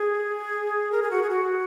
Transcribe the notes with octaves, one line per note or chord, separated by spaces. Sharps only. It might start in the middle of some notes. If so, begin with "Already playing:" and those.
Already playing: G#4
A#4
G#4
F#4
G#4
F#4